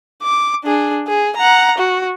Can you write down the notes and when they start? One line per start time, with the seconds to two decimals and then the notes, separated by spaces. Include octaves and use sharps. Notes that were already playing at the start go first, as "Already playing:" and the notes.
0.23 D6
0.64 D4 G#4
1.07 G#4
1.36 F#5 A#5
1.78 F#4